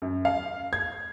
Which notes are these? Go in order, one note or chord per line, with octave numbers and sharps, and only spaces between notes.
F#2
F5
G#6